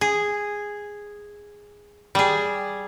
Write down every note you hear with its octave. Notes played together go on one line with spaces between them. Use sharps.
G#4
G3 G#4